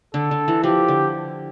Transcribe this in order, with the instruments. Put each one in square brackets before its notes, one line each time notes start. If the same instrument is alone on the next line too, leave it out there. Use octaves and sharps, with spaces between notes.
[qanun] D3 [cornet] A4
[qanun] D3
E3
[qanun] F3 [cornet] G4
[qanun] D3